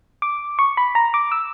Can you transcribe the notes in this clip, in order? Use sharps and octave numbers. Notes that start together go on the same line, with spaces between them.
D6
C#6
B5
A#5
D6
E6